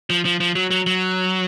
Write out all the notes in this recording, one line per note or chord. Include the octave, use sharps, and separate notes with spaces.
F3
F3
F3
F#3
F#3
F#3